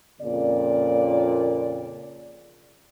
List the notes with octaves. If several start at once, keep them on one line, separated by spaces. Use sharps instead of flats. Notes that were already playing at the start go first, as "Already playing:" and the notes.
F2 A#2 C#3 A#3 D5